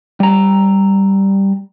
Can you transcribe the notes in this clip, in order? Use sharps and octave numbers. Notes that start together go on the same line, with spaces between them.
G3 A#5